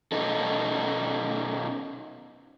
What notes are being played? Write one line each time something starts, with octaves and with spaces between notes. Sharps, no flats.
B2 C#4 D#4 A4